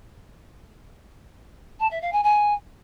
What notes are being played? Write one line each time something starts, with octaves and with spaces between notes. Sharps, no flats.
A5
E5
F5
G#5
G#5